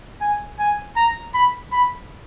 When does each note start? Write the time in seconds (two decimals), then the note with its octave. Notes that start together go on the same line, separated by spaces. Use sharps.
0.21 G#5
0.59 G#5
0.97 A#5
1.34 B5
1.72 B5